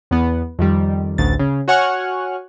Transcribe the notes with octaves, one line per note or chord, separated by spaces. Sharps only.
E2 B3
F2 D#3 G3
A1 D2 A6
C#3
F#4 C#5 F#5 G#5 C#6 F6